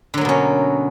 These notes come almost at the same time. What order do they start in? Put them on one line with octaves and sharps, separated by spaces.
D3 F#3 A#3 B2 C#4